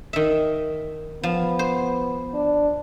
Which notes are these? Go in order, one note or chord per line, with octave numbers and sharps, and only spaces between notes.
D#3 E5
F3 B3
C5
D4